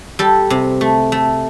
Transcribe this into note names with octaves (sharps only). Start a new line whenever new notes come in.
G3 A4
C3
A3
A3